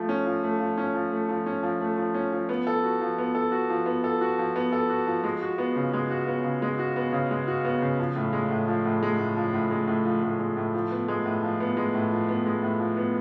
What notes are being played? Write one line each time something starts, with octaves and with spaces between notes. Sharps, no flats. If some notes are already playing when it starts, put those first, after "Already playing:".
Already playing: F3 A3
C#4
F3
A3
F3
C#4
F3
A3
F3
C#4
F3
A3
F3
C#4
F3
B3
A4
F#4
F3
B3
A4
F#4
F3
B3
A4
F#4
F3
B3
A4
F#4
F3
G#3
F#4
B3
C#3
G#3
F#4
B3
C#3
G#3
F#4
B3
C#3
G#3
F#4
B3
C#3
F3
A2
G#3
A2
F3
A2
G#3
A2
F3
A2
G#3
A2
F3
A2
G#3
A2
F3
B3
G#3
A2
F3
B3
G#3
A2
F3
B3
G#3
A2
F3
B3